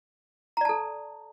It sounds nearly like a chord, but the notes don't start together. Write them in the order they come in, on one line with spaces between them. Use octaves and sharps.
A#5 D5 A5 A4